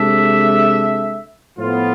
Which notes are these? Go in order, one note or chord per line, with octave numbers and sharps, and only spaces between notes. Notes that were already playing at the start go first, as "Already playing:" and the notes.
Already playing: C3 G#3 D4 A4 E5
A2 F3 B3 F4